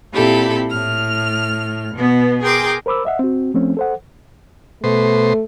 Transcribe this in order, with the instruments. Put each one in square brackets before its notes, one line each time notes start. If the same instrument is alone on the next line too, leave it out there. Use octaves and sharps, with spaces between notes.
[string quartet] A#2 C4 E4 G4 A4 B5
A2 F6
B2 B3
G#4 A#4 G5 C6 D6
[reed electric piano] A#4 C5 B5 D6 E6
D#5 E5 F#5
C4 F#4
F3 A3 C4 C#4
A4 C5 F#5
[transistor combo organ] B2 C5 [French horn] A3